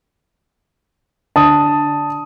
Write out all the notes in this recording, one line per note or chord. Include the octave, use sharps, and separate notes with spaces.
D3 D4 A5 D#6